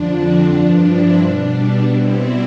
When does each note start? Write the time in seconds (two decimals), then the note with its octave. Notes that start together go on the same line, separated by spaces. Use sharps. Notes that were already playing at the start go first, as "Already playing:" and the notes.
Already playing: F2 D3 F3 D4
0.10 C4
0.45 G2 F3 D4
0.81 C4 E4
1.17 B2 G3 D4
1.53 D4
1.88 B2 G3 C4 E4